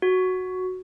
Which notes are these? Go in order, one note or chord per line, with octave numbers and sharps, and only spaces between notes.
F#4